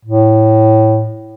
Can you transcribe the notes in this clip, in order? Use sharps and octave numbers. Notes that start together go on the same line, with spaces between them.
A2